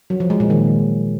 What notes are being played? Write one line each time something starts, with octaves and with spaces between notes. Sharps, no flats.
F#3
F3
G#3
A#2
D#3